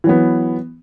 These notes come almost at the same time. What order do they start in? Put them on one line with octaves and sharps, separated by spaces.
E3 F#3 B3